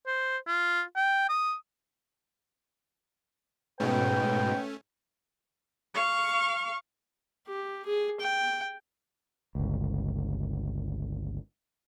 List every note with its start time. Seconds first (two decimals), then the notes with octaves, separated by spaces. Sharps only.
0.07 C5
0.47 F4
0.96 G5
1.29 D#6
3.80 G#2 B2 A3 C#4 B4 G5
5.94 F5 C#6
7.47 G4
7.86 G#4
8.20 G5
9.55 G1 C#2